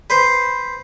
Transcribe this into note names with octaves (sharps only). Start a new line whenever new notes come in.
B4 C5